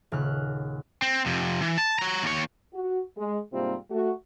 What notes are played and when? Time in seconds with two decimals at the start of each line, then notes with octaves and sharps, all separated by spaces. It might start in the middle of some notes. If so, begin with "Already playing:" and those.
0.12 D#1 C#3 F6 F#6
1.02 C4
1.26 F2 C3
1.62 E3
1.78 A5
1.99 C#5 A#5
2.23 D#2 C#5
2.73 F#4
3.17 G#3
3.52 G#2 C3 G3 A#3 C4 F4
3.91 A3 F#4